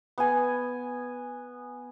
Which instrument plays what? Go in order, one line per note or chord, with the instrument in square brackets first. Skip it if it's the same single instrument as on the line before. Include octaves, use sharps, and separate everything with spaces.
[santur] B3 G#5